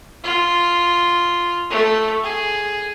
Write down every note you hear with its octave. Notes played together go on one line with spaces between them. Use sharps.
F4
A3
G#4